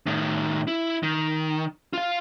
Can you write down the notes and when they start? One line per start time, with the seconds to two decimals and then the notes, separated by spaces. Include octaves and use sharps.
0.06 A2 D#3
0.68 E4
1.03 D#3
1.93 F4 F5